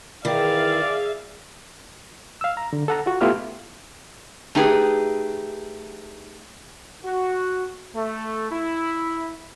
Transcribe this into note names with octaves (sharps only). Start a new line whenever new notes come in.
D#3 E3 G#4 A#4 D5 E5 F5
F5 E6
A#5
D3
A4 F#5 A#5
F4 F#4
A3 B3 E4 F4 G4 F6
A3 D#4 G4 G#4 B4
F#4
A3
E4